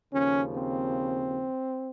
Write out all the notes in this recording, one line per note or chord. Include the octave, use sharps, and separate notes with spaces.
D#2 C#3 F3 C#4
C4